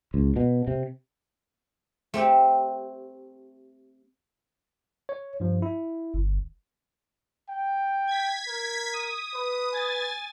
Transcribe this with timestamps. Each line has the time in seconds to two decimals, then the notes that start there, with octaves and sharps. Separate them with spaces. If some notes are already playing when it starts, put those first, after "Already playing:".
0.14 C#2
0.36 B2
0.67 C3
2.14 A3 C4 G4
5.09 C#5
5.40 G2 F3
5.62 E4
6.14 G1
7.49 G5
8.07 G#6 B6
8.48 A#4
8.93 D#6
9.35 B4
9.72 G#5 A6